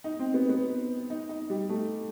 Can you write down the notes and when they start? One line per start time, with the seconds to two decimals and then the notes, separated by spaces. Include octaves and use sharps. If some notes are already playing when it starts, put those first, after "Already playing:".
0.04 D#4
0.19 C4
0.34 B3
0.49 B3
1.10 D#4
1.29 D#4
1.50 G3
1.69 A3